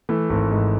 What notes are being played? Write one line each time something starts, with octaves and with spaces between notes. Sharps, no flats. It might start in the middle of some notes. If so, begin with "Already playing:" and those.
E3 A3
G#1
G#2